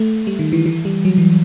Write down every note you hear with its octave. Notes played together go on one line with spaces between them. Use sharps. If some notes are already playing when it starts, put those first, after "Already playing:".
Already playing: A3
G3
D#3
E3
E3
G3
F#3
E3